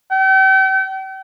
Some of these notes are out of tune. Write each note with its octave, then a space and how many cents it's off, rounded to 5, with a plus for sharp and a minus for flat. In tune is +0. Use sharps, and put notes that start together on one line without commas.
G5 -40